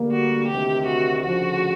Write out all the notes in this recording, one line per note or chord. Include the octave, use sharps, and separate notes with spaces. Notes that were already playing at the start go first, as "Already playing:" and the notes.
Already playing: D2 D3 G3 A#3
F#4
D2 C3 D#3 G4
F#4
D2 C#3 F3 F#4